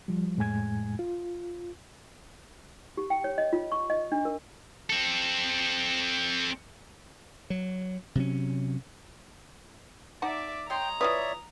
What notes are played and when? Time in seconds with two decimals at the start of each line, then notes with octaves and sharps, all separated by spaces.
0.08 F3 G3
0.37 F2 A2 G#3 G#5 G#6
0.99 F4
2.97 G4
3.10 G5
3.24 C#5
3.38 D#5
3.53 F4
3.72 C#6
3.90 D#5
4.12 D4
4.25 A#4
4.90 C4 A4
7.50 F#3
8.15 C3 F#3 C#4
10.22 D#4 D5 E5 F#5 A5 D6
10.70 C#5 D#5 G5 A#5 C6
11.01 E3 F4 B4 C#5 D5 E5 D#6